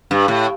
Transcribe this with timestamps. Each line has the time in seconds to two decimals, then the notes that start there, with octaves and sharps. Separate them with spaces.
0.11 G2
0.28 A2